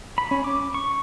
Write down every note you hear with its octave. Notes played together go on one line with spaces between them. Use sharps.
B5
C#4
D6
C#6